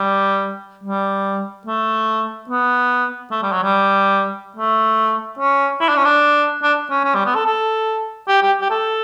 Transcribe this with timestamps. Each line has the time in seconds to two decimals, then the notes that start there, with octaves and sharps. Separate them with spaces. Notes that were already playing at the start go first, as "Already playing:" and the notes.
Already playing: G3
0.84 G3
1.67 A3
2.49 B3
3.31 A3
3.43 G3
3.52 F#3
3.63 G3
4.57 A3
5.39 C#4
5.80 E4
5.89 D4
5.96 C#4
6.04 D4
6.63 D4
6.90 C#4
7.04 C#4
7.15 G3
7.25 B3
7.35 A4
7.46 A4
8.28 G4
8.42 G4
8.61 G4
8.70 A4